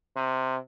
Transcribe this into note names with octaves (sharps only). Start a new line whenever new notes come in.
C3